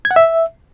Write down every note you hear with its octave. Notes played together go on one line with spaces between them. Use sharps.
G#6
F#5
E5